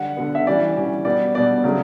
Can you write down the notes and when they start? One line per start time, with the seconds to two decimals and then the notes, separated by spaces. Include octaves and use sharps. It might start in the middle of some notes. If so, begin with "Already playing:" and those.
Already playing: D3 G3 F#5
0.17 D3 G3 B3
0.35 E5
0.47 E3 G3 C#4 D5
0.76 E3 G3 C#4
1.05 B2 G3 B3 D5
1.35 B2 G3 B3 D5
1.64 C#3 F#3 A3